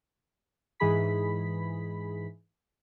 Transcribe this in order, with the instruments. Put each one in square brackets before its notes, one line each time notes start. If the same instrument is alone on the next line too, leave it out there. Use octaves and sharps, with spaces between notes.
[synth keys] G#2 E3 G#4 B5 B6